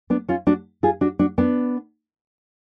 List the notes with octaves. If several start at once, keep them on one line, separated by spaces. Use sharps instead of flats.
B3 D4
C#4 F4
D4 F#4
F4 G#4
D4 F#4
D4 F#4
B3 D4